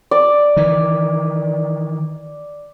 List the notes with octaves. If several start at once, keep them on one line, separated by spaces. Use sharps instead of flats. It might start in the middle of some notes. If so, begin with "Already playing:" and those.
D5
D#3 E3